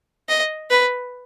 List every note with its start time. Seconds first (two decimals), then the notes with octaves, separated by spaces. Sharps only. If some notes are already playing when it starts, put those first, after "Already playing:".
0.29 D#5
0.71 B4